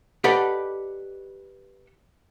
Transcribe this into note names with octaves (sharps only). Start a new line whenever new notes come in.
G4 A4 B4 D5 D#5 F#5